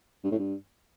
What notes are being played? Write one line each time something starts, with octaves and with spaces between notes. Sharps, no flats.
G2
A2
G2